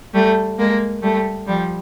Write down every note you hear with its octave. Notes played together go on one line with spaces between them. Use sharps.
G3 A3
G#3 A#3
G3 A3
F3 G3